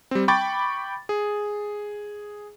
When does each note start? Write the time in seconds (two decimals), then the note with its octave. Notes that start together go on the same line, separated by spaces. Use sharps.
0.11 G3 C4
0.28 G5 B5 C#6 D6 A6
1.09 G#4